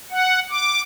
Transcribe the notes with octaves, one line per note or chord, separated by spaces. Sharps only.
F#5
D6